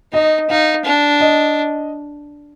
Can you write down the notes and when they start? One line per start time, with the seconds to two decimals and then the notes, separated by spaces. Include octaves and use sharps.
0.14 D#4 D#5
0.50 D#4 F5
0.85 D4
1.20 D#5